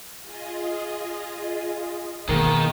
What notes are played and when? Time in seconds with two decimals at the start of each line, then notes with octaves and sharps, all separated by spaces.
0.18 F4 G#4 D#5
2.28 B2 D#3 G#3 A#3 B3